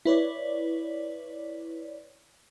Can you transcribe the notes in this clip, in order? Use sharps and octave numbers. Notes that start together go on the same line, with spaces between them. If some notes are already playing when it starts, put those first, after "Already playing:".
E4 B4 C#5 D5